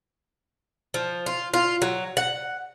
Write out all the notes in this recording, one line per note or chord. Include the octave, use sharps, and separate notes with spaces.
F3
F4
F4
F#3
F#5